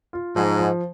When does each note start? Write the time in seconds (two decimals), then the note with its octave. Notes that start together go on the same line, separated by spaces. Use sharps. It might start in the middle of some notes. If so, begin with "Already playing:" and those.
0.13 F4
0.36 G#2 F3
0.59 F3